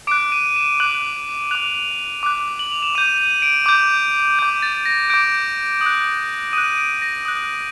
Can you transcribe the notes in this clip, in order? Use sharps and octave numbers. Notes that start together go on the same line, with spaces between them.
D6 F#6 D7
D#7
D#7
E7
D6 F#6 F#7
D6 F#6 F7
D6 F#6
F#7
F7
E7
D6 G6 D#7
D#7
D7
D6 G6
D6 G6
A6
A#6
D6 G6 D7
D#6
F#6
D#6 F#6 D#7
D7
A#6
D#6 F#6